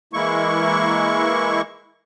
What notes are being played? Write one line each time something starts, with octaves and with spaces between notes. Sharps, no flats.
E3 G#3 A#3 E4 C#6